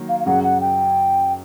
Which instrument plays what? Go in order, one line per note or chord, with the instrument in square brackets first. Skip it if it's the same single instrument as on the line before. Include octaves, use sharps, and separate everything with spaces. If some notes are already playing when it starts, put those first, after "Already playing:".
Already playing: [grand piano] D#3 F#3 A#3
[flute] F5
F5
[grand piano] F#2 C#3 F#3 [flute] F#5
[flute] F#5
G5